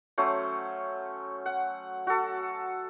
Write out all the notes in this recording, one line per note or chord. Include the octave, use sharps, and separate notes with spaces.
F#3 A3 C#4 C5
F#5
F#4 A4